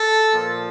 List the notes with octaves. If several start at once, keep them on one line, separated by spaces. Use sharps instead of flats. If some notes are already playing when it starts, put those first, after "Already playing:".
Already playing: A4
A#2 F3